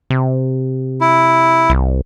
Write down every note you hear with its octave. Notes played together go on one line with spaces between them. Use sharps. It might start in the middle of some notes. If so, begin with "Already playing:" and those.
C3
E4
C2